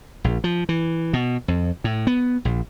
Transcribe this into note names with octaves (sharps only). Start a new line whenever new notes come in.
A#1
F3
E3
B2
F2
A2
B3
A#1